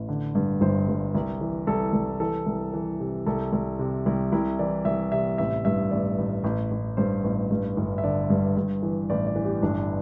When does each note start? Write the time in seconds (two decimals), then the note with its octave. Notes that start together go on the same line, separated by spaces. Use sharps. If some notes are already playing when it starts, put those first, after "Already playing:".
Already playing: A1
0.09 D3
0.35 G2
0.61 G1 C5
0.88 G2
1.15 C2
1.41 E3
1.67 C2 A4
1.93 C2
2.20 E3 A4
2.47 C2
2.74 E3
3.00 C3
3.26 C2 A4
3.53 C2
3.79 C3
4.06 C2
4.32 C2 E4
4.59 E3 D5
4.85 C2 E5
5.12 C3 E5
5.38 A1 E5
5.65 G2 E5
5.91 A1 D5
6.18 A1
6.44 A1
6.71 A1
6.97 G2 C5
7.24 A1
7.51 G2
7.77 G1
7.98 E5
8.04 D3 D5
8.30 G2
8.57 G2
8.83 E3
9.10 A1 D5
9.27 D5
9.36 E3
9.45 G4
9.63 G1 D4